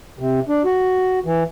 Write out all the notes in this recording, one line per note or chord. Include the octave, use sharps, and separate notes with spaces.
C3
D4
F#4
E3